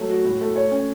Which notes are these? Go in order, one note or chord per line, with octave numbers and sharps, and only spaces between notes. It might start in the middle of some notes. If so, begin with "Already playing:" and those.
Already playing: F#3 A3
F#4
A2
A3
C#5
C#4